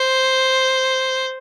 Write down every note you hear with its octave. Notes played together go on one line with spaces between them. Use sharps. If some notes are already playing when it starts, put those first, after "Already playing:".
Already playing: C5